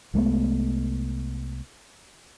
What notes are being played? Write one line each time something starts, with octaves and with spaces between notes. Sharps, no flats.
C2 G#3 A3 B3